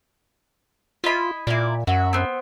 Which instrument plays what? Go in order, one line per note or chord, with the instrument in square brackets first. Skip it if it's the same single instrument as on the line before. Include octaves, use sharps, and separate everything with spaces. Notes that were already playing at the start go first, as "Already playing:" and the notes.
[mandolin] E4 D#5 B5 [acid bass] F4
[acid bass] A#2 [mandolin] E4 D5
[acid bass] F#2 [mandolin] F#4 E5
[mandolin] B3 C4